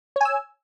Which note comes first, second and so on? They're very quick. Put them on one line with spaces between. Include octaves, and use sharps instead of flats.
C#5 G#5 E6